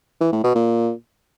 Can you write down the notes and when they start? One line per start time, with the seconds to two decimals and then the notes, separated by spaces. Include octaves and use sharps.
0.20 E3
0.32 A2
0.43 B2
0.55 A#2